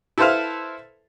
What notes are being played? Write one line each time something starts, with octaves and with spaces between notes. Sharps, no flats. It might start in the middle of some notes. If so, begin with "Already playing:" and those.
E4 A4 B4 C5 E5 F5